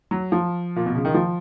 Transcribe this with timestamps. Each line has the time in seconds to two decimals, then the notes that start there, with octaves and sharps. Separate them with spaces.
0.11 F#3
0.32 F3
0.76 A#2
0.86 B2
0.95 C#3
1.05 D#3
1.14 F3